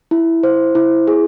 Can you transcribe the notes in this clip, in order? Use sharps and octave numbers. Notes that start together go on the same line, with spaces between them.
E4
C5
E4
G#4